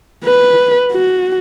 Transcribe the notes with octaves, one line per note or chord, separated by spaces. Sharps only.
B4
F#4